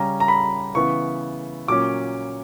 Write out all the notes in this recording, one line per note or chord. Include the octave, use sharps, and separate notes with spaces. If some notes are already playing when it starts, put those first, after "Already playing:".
Already playing: C#3 G3 C#4 A#5
A#5
B5
C#3 E3 B3 C#6
A#2 F#3 C#4 D6